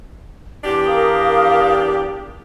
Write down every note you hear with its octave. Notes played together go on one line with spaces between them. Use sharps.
E2 D4 G4 D6
A#4 F5 D#6